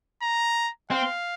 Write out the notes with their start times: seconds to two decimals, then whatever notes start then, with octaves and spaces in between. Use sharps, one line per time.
0.23 A#5
0.91 C4 F5